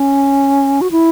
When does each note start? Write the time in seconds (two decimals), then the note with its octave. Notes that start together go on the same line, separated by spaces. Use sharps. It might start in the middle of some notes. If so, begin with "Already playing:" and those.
Already playing: C#4
0.81 F#4
0.91 E4